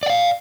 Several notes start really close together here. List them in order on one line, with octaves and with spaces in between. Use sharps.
D5 F#5 F5